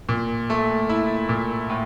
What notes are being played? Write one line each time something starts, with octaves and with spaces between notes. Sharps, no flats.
A#2
A3
E4
A#2
A2